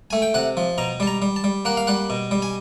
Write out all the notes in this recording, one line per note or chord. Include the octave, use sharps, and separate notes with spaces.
A3 G#5
G5
C3 F#5
F3
B2 A#5
G3 A5
A#5
G3
A5
G3
A#3 F#5
F5
G3 F#5
B2
G3
G#5